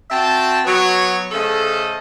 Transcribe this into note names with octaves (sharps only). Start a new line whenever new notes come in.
C4 F#4 E5 G5 A5
F#3 B3 C#5
C#3 A3 A4 C5 D#5 A5